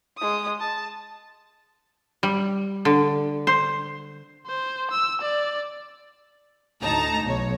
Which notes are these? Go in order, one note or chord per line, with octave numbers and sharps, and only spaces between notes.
G#3 D#6
A5
G3
D3
C5
C5
E6
D5
D2 A2 D#4 A5 A#5
B1 C#5